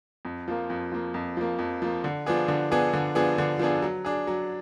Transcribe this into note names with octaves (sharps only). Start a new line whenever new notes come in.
F2
F3 A#3
F2
F3 A#3
F2
F3 A#3
F2
F3 A#3
D3
F3 B3 D4 G#4
D3
F3 B3 D4 G#4
D3
F3 B3 D4 G#4
D3
F3 B3 D4 G#4
F#3
D4 G#4
F#3